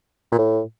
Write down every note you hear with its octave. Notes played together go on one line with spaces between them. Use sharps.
A#2
A2